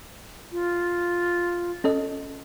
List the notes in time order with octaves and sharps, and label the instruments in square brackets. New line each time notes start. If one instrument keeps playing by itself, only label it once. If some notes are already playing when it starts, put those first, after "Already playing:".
[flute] F4
[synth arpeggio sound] C#4 A4 D#5